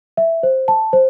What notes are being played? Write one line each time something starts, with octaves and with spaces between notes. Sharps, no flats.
E5
C5
A5
C5